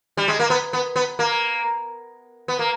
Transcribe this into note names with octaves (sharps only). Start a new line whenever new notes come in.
G3
G#3
A#3
B3
B3
B3
A#3
B3
A#3